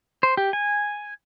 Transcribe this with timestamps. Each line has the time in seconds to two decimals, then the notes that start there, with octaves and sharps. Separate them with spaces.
0.23 C5
0.37 G4
0.53 G#5